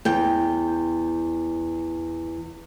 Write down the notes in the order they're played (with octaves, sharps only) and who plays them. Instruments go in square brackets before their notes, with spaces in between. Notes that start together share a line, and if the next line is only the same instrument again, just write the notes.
[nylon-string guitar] E2 G5